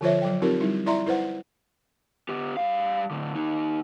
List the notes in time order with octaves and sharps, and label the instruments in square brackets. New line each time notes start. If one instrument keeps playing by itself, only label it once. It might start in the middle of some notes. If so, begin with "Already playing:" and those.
[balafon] D3 F3 F4 C5 C#5 E5
F#3 G5
C4 D#4 F4 G4 A#4
G3 D#4 E4
E4 D5 E5 A#5 C6
E4 B4 C5 F#5
[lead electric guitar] B3 G4
G3 F5
A2 D3
A#3 D#4